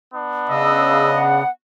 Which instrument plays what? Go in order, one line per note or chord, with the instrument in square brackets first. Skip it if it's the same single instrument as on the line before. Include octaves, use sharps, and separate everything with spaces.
[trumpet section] B3 D4
[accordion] C#3 [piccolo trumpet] D#5 [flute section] E6
[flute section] F#5